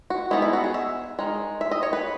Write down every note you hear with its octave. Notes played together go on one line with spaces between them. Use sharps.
F#4
G#3 B3 D#4 E4
E4
F#4
G#4
E5
D#3 G#3
E5
D#5
C#5
B4